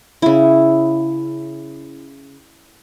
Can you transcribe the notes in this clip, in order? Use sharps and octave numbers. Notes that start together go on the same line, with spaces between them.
C#3 E4